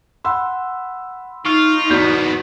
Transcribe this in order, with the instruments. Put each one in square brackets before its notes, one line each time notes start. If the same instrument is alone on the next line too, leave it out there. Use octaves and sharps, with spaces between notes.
[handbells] F#5 C6 [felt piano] B5 E6
[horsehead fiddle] D#4 [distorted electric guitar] F4 [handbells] C#6 F6
[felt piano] E2 F#4 G6 [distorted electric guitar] G#2 B3